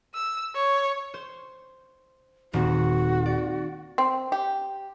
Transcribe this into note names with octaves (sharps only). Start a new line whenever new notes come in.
E6
C#5
C5
D#1 C4 F#4
D5
C4
G4